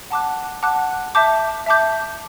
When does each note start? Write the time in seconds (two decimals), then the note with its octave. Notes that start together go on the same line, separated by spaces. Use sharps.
0.10 F#5 A5 D6 F#6
0.63 F#5 A5 D6 F#6
1.15 E5 A5 D6 G6
1.66 E5 A5 D6 G6